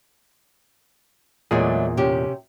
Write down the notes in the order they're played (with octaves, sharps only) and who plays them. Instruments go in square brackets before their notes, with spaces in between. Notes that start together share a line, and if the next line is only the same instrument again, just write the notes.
[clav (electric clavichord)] E2 A#2 G#4 [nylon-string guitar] F#3 G#3 A3
[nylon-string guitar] C3 C#4 G4